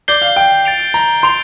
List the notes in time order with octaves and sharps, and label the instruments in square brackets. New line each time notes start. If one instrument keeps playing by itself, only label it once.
[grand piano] D5 [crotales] G6 C7 G7
[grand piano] F5
G5
[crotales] A6 D7 F7
[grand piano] A#5
[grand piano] C6 [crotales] G6 D7 F7